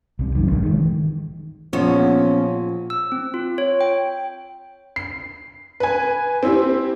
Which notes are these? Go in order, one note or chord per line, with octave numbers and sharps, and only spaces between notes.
C2 C3
C2 F#2 D#3
F1 A#1 G#2 D3
D#3 F#3 G#3
E3
A#1 F3 B3 C#4
E6
C4
F4
C#5
G5
C7
B4 G#5
C4 E4 G4